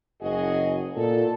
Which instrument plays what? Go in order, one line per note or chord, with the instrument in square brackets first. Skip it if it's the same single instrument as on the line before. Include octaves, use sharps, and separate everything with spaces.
[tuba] F#1 [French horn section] F#4 G#4 D#5
[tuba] A#2 [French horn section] A4